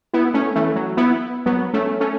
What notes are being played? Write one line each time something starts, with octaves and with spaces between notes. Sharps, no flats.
B3 E4
A3 C#4
E3 A3
F#3
B3 E4
F#3 B3
A3 C#4
A3 C#4